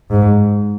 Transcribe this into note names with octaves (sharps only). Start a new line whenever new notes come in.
G#2